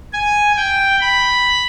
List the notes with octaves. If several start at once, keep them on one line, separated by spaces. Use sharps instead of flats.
G#5
G5
B5